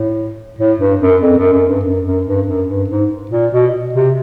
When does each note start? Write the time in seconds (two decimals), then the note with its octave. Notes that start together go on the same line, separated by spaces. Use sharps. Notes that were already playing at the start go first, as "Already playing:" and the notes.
Already playing: A2
0.59 A2
0.79 G2
1.01 F#2
1.22 F2
1.37 F#2
1.53 F#2
1.69 G2
1.85 F#2
2.06 F#2
2.27 G2
2.48 F#2
2.68 G2
2.90 G#2
3.31 A#2
3.52 B2
3.94 C3